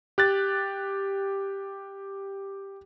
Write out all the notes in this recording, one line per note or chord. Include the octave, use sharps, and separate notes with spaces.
G4 F#6 A6